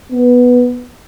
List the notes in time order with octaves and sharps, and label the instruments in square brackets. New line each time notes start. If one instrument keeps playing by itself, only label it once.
[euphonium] B3